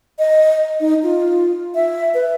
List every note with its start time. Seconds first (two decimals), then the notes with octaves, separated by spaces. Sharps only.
0.19 D#5
0.80 D#4
1.03 F4
1.75 E5
2.14 B4